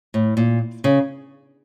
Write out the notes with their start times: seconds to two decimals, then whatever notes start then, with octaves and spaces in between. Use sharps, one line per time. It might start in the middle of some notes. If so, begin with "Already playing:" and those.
0.14 A2
0.37 A#2
0.84 C#3